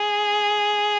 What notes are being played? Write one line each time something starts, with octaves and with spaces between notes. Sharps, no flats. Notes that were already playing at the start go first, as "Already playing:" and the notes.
Already playing: G#4